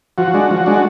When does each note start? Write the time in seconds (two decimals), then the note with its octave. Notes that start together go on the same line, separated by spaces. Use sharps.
0.18 F3 F#4
0.34 G#3 D4
0.51 F3
0.66 G#3 D4